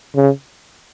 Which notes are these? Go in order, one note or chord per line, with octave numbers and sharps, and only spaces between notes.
C#3